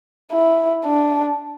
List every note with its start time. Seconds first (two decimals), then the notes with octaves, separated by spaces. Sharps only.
0.31 E4
0.85 D4